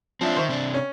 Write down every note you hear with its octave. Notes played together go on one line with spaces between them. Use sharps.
F3 C4 D4 E5
D#3 C5 E5 C#6
C3 D4
C#4